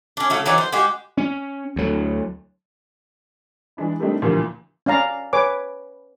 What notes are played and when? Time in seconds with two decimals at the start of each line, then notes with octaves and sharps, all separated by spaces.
0.17 C#4 D4
0.30 C#3 F#3 A3
0.45 E3 F#3 D#4 D5
0.58 C5
0.73 G#3 F#4 G4
1.18 C#4
1.76 D2 F#3
3.77 E3 G#3 D4 E4
3.99 G3 A3 A#3 C4 D4 D#4
4.22 D2 A#2 E3 F3 G3 A#3
4.86 C#4 D5 F5 A#5
5.33 B4 C#5 G#5 D6